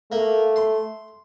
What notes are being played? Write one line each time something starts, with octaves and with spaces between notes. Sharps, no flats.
A3 A#3
C6